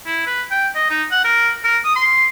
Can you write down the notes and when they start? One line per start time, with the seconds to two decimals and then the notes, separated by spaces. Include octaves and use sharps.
0.06 E4
0.26 B4
0.51 G5
0.75 D#5
0.90 D#4
1.11 F#5
1.24 A#4
1.64 A#4
1.84 D#6
1.95 C6